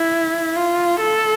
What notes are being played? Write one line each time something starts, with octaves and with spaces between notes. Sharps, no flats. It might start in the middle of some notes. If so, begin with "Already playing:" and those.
Already playing: E4
F4
A4